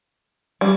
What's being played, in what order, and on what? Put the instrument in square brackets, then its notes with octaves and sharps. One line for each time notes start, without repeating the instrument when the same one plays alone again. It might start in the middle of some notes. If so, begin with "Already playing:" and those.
[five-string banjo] G3